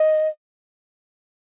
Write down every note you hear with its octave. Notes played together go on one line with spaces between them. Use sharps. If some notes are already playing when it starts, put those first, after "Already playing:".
Already playing: D#5